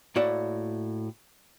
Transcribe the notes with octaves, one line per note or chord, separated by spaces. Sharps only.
A2 A#3 F#4 D5 E5